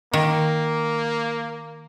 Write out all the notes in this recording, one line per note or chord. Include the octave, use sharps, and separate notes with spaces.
D#3 A#3